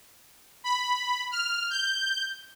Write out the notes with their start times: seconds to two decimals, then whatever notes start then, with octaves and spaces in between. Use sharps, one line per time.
0.64 B5
1.31 F6
1.70 G6